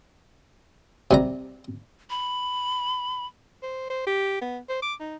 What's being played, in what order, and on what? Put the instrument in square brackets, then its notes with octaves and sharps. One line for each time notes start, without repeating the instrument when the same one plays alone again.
[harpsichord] C3 G3 A#5
[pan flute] B5
[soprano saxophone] C5
C5
G4
B3
C5
D6
D#4